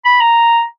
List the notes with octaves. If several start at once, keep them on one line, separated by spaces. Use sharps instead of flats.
B5
A#5